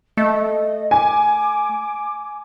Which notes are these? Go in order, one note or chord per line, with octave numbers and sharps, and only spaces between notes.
A3 D#5
G#5 D6